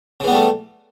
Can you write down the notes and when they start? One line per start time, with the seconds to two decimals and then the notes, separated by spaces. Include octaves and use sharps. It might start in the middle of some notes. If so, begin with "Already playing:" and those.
0.20 C#3
0.24 E3
0.27 B3
0.31 G3
0.34 A3